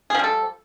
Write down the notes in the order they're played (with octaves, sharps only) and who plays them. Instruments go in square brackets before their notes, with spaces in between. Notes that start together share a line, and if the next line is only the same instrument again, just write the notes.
[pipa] G#4
F3
G3
A4